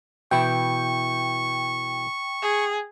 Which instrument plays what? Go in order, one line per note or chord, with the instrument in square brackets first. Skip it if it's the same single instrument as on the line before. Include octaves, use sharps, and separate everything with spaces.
[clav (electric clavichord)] B2 E3 E4 [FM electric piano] G5 [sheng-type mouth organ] C#6
[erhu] G#4